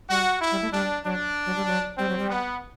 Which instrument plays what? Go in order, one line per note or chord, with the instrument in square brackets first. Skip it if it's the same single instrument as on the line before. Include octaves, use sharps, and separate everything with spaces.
[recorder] G3 [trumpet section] F#4
[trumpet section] E4
[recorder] G3
A3
[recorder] G3 [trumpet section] D4
[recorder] F#3 [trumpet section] D4
[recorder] F#3
G3
F#3
[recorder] G3 [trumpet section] C4
[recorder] F#3
G3
[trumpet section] B3